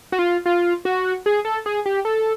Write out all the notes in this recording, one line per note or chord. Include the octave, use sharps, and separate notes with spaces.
F#4
F4
F4
F#4
G#4
A4
G#4
G4
A4